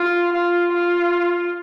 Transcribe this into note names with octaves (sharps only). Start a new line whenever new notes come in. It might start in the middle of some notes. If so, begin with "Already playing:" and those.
Already playing: F4
F4
F4